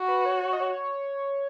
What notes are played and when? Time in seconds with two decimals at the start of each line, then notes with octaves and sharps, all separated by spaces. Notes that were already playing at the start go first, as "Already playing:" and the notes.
Already playing: F#4
0.08 B4
0.26 C#5
0.43 C#5
0.53 D#5
0.60 C#5